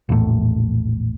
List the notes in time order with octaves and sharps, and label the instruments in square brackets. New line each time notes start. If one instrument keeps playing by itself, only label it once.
[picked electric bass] A#1 E2 A2